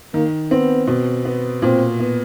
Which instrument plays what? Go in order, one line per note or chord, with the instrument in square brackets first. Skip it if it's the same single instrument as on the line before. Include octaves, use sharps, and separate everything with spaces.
[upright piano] D#3 [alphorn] A#3
[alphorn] B3 [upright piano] C4
[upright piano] B2
B3
[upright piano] A#2 [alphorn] C4
[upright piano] B3